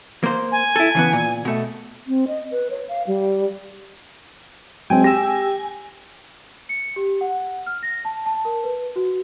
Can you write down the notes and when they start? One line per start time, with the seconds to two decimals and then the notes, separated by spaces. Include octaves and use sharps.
0.24 A#3 C5
0.52 G#5
0.76 E4 A4
0.95 C#3 E3 B3
1.13 A#2
1.45 B2 A3
2.06 C4
2.28 D#5
2.51 B4
2.71 C#5
2.89 F5
3.07 G3
4.90 F#3 G#3 C4 G5 G#5
5.04 G4 E6 A#6
6.69 C#7
6.96 G4
7.21 F#5
7.66 F6
7.83 A#6
8.05 A5
8.26 A5
8.45 A#4
8.64 B4
8.96 F#4